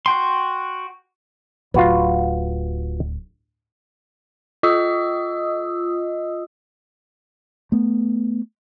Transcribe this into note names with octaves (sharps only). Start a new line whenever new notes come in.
F#4 G5 C6
D1 F4 F#4 B4
F4 D#5 D#6 E6
A3 B3